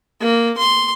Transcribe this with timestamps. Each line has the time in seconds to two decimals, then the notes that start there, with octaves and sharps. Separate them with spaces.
0.20 A#3
0.57 C6